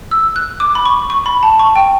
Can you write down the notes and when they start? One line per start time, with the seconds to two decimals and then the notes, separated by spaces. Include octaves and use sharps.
0.11 E6
0.36 F#6
0.60 D6
0.75 B5
0.85 C#6
1.10 C#6
1.26 B5
1.43 A5
1.59 C#6
1.76 G5